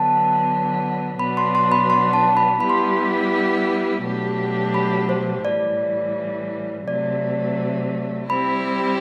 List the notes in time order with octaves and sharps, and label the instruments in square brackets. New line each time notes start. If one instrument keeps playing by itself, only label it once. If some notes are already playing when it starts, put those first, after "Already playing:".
Already playing: [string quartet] D3 F#3 B3 [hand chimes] A5
[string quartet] B2 F#3 B3 D4 [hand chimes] B5
[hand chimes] C6
C6
B5
C6
A5
B5
[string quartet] G3 B3 E4 G4 [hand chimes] B5
[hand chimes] C6
B5
[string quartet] B2 F#3 A3 D4 G4
[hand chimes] B5
C5
[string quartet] A2 E3 G3 [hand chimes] D5
[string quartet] C3 F#3 A3 [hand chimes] D5
[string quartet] G3 C4 E4 G4 [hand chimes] B5